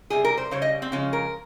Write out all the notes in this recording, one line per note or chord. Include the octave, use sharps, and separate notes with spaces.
C3 G3 G#4
A#4
C5
C#3 G3 C#5
D#5
C4
C#3 F3 G#3 C#4
A#4